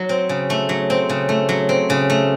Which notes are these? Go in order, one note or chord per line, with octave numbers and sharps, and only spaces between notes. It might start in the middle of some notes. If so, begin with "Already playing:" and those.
Already playing: F#3
C4
C#3
A3
F#3
C4
C#3
A3
F#3
C4
C#3
A3